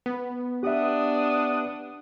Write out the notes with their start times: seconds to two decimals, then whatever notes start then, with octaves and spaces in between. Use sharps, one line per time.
0.06 B3
0.63 D4 G4 E5 F#5 D#6